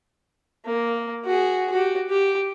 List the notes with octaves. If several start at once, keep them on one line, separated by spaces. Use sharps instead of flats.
A#3
F#4 G#4
F#4 G4
G4